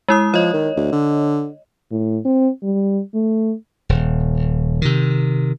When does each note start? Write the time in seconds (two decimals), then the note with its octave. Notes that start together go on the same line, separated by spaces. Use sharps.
0.08 G#3 E4 D#6
0.34 F3 C#5 D#5
0.54 D#3
0.77 D2
0.93 D3
1.91 A2
2.25 C4
2.63 G3
3.14 A3
3.89 D#1
4.82 C3 D#3